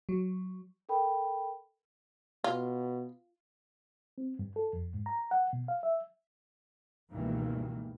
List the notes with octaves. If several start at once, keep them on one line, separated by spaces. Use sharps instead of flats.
F#3
A4 A#4 G5 B5
B2 F4
C4
G2
A4
F2
G#2
A#5
F#5
B2
F5
E5
C#2 G2 B2 D#3 E3 A#3